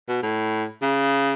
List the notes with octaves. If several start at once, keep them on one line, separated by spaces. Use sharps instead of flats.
B2
A2
C#3